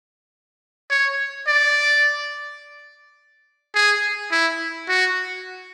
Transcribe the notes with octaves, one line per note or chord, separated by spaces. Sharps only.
C#5
D5
G#4
E4
F#4